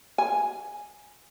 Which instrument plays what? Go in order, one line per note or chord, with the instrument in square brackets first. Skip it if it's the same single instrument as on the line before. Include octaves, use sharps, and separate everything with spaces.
[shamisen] G#5